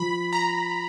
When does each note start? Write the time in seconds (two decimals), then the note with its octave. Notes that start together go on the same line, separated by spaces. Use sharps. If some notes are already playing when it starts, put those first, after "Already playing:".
Already playing: F3 B5
0.33 A#5